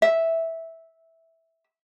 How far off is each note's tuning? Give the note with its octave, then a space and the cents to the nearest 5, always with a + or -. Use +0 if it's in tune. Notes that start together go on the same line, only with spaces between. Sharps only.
E5 -10